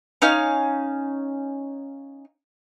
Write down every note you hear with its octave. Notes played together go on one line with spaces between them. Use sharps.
C#4 D#4 F5 F6